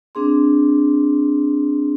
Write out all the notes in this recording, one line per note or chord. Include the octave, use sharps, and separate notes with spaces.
C4 D4 G#4 C6